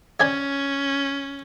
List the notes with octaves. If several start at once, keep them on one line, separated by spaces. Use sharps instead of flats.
C#4 C#5 D5 G#5